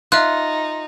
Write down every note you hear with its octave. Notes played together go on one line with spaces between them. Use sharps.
D#4 F4 E5 F#6